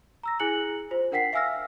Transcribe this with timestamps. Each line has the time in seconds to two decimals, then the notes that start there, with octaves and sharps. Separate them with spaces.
0.23 A#5 E6 A#6
0.40 E4 G#4 G#5 F#6 C#7 F#7
0.91 F4 C5
1.12 D4 A#4 F#5 G5 B6 C7
1.33 E5 F5 G#5 E6 F6 A#6